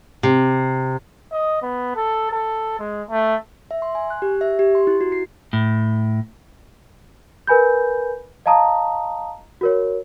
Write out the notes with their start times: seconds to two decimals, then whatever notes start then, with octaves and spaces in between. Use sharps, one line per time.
0.23 C3
1.32 D#5
1.62 B3
1.96 A4
2.31 A4
2.79 G#3
3.10 A3
3.71 E5
3.82 C6
3.95 G#5
4.10 F#6
4.22 G4
4.41 E5
4.59 G4
4.75 C6
4.87 E4
5.01 F#4
5.12 C7
5.53 A2
7.47 A#4 B4 G#5 B5 G6
8.46 D#5 F5 A5 A#5 D#6
9.61 F#4 A#4 C#5